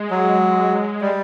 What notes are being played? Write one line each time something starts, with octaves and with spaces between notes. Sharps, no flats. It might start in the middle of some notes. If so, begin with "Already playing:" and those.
Already playing: G#3
F#3
G3